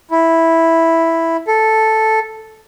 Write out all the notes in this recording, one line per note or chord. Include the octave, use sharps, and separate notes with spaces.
E4
A4